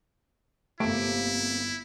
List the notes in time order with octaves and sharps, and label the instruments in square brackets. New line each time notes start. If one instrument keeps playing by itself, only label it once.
[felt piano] G1 D7 [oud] C3 A#3 [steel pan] A3 [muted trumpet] E4